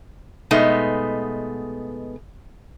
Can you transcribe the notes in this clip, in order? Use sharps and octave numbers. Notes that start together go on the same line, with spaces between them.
B2 G#3 A3 B3 D#4